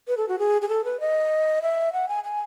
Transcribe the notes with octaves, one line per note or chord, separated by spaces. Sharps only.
B4
A4
F#4
G#4
G#4
A4
B4
D#5
E5
F#5
G#5
G#5